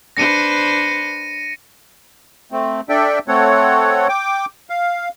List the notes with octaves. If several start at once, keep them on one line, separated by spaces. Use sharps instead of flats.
D4 B4 C5 A#6 C#7 D#7
A3 C4
D4 A4 D5 E5 G5
A3 C4 A4 C#5 F#5
G5 D6
F5